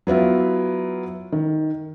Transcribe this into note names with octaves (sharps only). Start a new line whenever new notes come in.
F#3 B3 E4 F4
D#3